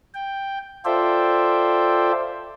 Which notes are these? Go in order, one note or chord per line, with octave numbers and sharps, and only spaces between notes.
G5
F4 A4 C5 D5 E5 G5